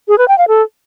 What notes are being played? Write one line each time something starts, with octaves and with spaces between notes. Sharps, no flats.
G#4
B4
G5
F5
A4